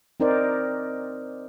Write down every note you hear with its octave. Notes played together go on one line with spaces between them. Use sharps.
C4 D#4 A#4 C5 D5